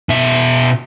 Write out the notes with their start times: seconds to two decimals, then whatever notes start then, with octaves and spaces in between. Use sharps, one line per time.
0.09 B2 E5